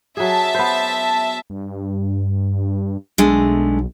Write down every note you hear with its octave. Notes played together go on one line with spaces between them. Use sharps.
F#3 G#4 E5 A5
B3 C5
G2
B1 D3 G#3 A3